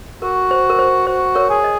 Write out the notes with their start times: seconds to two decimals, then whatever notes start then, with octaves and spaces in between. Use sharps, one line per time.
0.22 F#4 A#4
0.51 C5
0.70 A#4
0.79 C5
1.07 F#4 C5
1.35 A#4 C#5
1.49 G#4
1.64 D#5